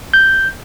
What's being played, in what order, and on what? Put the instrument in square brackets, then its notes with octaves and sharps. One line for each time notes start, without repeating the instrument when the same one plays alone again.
[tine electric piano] G6